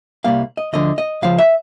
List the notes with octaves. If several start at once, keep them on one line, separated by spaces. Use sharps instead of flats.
C2 B2 G3 A#3 F5
D#5
D2 D3 F3 D#5
D#5
C#2 C#3 F3 F5
E5